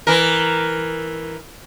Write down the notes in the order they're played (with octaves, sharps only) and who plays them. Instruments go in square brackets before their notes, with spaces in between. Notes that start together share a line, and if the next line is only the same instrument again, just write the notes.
[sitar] E3 A#4